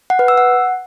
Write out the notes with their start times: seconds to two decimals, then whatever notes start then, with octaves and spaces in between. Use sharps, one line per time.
0.10 F#5
0.19 B4
0.28 E6
0.38 F#5